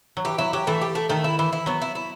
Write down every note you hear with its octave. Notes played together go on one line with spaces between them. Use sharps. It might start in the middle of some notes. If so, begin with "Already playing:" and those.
F#3
E3 G4
F#3 E4
F#3 G4
E3 A3
G4
A3
D#3 A3
E4
E3 E4
E4
F#3 B3
E4
E4